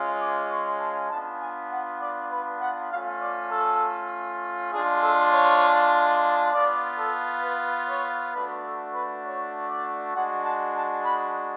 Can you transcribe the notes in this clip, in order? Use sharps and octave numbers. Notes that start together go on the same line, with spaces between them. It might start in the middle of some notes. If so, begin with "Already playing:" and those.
Already playing: G#3 C#4 F4
D6
C#6
A5
B3 D4 F4 A5
G#5
F#5
D5
B4
F#5
A3 C#4 F4 F5
D5
A4
G#3 D4 F4 G#4
A4
C#5
B3 F4 D5
A4
B4
C#5
A3 D4 F#4 B4
A4
B4
C#5
D5
G#3 D4 F#4 F#5
A5
A5
B5